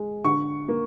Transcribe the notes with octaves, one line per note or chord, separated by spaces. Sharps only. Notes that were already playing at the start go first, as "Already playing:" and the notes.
Already playing: G#3
D3 C#6
A#3